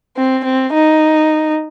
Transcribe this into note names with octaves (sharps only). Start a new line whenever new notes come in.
C4
C4
D#4